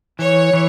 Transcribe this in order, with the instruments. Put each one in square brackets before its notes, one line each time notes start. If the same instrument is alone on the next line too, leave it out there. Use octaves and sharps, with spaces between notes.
[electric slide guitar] E3 [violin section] C#5
[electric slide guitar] E3